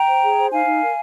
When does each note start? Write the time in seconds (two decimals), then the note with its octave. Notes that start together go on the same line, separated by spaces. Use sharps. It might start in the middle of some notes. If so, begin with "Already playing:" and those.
Already playing: G5 A#5
0.08 C5
0.23 G#4
0.37 C5
0.52 D#4 F5 G#5
0.66 D#4
0.81 A#4